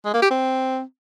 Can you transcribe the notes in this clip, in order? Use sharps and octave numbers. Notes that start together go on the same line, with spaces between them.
G#3
A#3
G4
C4